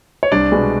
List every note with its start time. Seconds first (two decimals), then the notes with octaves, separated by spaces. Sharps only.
0.23 C#5
0.31 C2 D4 D5
0.52 B2 G#3 B3 D4